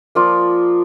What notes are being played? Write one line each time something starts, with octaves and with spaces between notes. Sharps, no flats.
F3 A#3 F4 D5